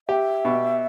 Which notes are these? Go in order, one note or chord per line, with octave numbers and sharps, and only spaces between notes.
G4 E5
B2